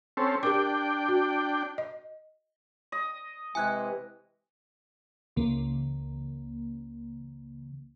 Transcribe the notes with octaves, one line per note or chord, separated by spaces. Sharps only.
C4 C#4 A4
D4 G4 A#4 G5 D6
F#4
D#5
D#5
C3 E3 G#3 G#5 F#6 G#6
C#2 C#3 E3 A#3